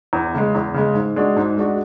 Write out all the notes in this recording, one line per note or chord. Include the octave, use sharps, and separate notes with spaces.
E2
C#3 G#3
E2
C#3 G#3
G#2
G#3 D4 F#4
G#2
G#3 D4 F#4